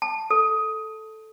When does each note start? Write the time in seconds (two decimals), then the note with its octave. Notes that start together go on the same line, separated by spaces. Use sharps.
0.02 A5
0.30 A4